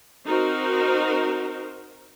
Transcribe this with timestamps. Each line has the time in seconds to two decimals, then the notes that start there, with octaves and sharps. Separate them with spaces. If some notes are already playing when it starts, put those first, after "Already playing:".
0.25 C4 D#4 F#4 A#4 C5